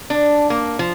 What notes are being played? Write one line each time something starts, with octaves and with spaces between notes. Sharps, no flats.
D4
A#3
F3